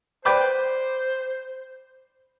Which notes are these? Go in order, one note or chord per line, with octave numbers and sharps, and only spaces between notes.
B4 C5 D5 G5